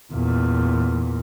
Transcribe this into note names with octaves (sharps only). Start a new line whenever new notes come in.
E2 A#2